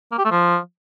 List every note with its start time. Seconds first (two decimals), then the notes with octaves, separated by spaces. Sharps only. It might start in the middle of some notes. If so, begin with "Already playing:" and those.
0.12 A#3
0.18 G4
0.25 A3
0.31 F3